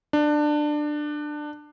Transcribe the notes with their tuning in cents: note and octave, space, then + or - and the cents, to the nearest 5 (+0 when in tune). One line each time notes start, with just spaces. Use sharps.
D4 +20